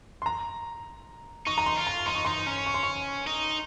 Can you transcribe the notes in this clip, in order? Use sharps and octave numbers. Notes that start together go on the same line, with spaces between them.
C6
A#5
D#4 C#6
A#5
C6
F4
A#5
D#4 C6
C#6
D#4 C6
C#4
C#6
C6
C#6
D#4